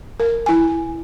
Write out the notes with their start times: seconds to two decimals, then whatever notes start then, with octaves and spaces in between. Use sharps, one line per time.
0.20 A#4
0.46 E4 G#5